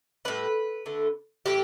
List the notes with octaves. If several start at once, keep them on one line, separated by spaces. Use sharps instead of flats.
A2 G3 B4
D3 A3
A2 E3 G3 G4